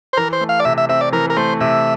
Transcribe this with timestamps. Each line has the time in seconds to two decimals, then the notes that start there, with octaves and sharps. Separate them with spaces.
0.13 C5
0.17 E3 A#4
0.33 C5
0.41 A3
0.49 F5
0.60 D5
0.65 C3 E5
0.78 E5
0.89 C4 E5
1.01 D5
1.12 E3 A#4
1.30 A#4
1.36 A3 C5
1.61 C3 E5